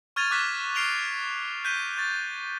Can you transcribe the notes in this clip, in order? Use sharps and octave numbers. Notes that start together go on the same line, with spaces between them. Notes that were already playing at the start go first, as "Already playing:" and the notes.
C#6 F6 G#6 A6 D#7 F7
C#6 D6 F#6 B6 E7
F6 C7 D7 F7 G7
F#6 G6 B6 D#7 G7
C#6 A6